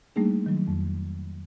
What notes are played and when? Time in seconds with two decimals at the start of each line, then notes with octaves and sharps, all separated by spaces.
0.16 G3 A3 A#3 D4 D#4 G#4
0.46 D#3 F#3
0.68 F2